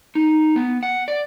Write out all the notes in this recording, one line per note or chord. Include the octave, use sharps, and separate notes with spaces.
D#4
B3
F#5
D5